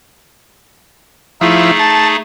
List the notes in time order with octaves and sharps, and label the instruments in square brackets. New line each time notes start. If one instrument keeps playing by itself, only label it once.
[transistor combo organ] F3 E4 [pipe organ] A3 D#4 G#4
[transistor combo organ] A5